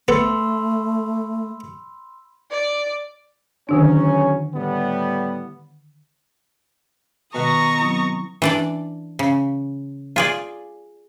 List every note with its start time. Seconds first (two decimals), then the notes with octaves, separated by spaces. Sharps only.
0.08 A3 B3 A4 B5 C6 E6
2.51 D5
3.69 E2 D3 D#3 F#3 C#4 D4
4.55 A2 G3 B3
7.35 B2 D#3 F#4 B4 A#5 C#6 D#6 A#6
7.80 F#3 C4 E4
8.42 E3 D4 D5
9.19 C#3
10.16 F4 G#4 D5